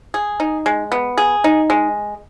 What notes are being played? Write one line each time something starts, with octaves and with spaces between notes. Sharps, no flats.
G#4
D#4
G#3
B3
G#4
D#4
G#3